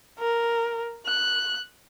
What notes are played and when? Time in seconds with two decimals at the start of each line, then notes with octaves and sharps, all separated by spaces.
0.19 A#4
1.06 F#6